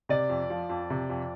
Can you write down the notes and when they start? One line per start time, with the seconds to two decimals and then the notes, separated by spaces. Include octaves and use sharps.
0.09 C3 D5
0.30 F2
0.50 F3
0.70 F2
0.90 C3
1.10 F2